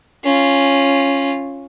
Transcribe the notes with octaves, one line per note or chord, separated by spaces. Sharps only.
C#4 F4